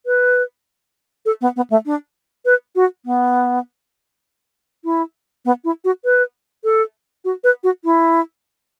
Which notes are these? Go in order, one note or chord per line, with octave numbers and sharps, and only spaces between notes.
B4
A4
B3
B3
A3
D4
B4
F#4
B3
E4
B3
E4
F#4
B4
A4
F#4
B4
F#4
E4